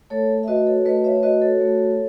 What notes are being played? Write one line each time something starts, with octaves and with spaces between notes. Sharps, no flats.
A3 A4 C#5
E5
F#4 B4 D#5
A4 C#5
A3 B4 D#5
C#5 E5
F#4 B4 D#5
A4 C#5
A3